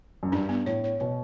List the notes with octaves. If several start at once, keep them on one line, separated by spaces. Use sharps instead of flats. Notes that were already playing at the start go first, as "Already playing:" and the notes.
F#2
G2 D4
B3
A2 C#5
C#5
B2 C#5